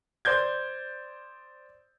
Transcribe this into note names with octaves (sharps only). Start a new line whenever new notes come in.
C5 D5 G6 G#6